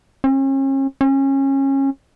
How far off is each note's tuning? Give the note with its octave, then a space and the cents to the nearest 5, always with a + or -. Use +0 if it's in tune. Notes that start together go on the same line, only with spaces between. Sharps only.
C#4 -40
C#4 -25